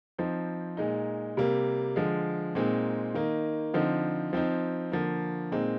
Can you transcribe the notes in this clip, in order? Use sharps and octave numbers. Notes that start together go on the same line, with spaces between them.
F3 C4 D#4
A#2 G#3 D#4
C3 G3 A#3
D3 F3 G#3
A#2 G#3 C4 D#4
D#3 A#3 D#4
D3 F3 C4 D#4
F3 C4 D#4
D3 F3 A#3
A#2 G#3 C4 D#4